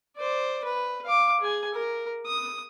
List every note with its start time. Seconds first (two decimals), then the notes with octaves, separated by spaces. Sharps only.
0.17 C5 D5
0.64 B4
1.05 F5 D6
1.40 G#4 G#5
1.74 A#4
2.26 D#6